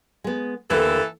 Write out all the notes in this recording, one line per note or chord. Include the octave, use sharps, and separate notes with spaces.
G#3 B3
D#2 D3 E3 A3 A4